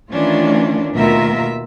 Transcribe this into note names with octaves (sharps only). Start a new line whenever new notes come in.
D#3 E3 A3 C#4 D4 F4
D#2 B2 A3 F4 A#4 E5